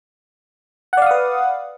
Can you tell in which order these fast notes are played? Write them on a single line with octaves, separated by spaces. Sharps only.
F#5 D5 F5 D#6 B4